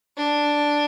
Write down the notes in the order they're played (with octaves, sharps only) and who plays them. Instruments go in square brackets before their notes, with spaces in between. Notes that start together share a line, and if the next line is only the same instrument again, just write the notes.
[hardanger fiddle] D4